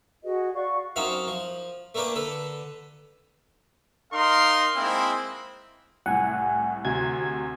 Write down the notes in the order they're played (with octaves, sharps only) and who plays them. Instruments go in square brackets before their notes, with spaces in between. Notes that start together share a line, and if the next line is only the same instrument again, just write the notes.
[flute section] F#4 G#4 B4 D#5
F#4 D5 F5 C#6
[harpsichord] F#2 C4 D#4 F#4 E5 F5
F3
A3 A#3 D4 A#4 B4 G5
D3 A4 B4
[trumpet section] D#4 A#4 F5 C6
G#3 A#3 C4 E4
[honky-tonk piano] C2 A2 [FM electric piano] F#5 G#5
[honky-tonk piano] D2 C3 [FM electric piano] G#6